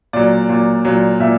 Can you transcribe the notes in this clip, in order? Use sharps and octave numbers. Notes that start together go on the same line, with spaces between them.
A#2 F#3 D5
A#2 F#3
A#2 F#3
A#2 E5